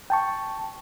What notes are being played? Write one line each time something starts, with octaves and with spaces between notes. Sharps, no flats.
G5 A5 C#6